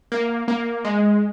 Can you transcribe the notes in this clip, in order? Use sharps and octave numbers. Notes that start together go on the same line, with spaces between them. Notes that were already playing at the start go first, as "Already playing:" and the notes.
A#3
A#3
G#3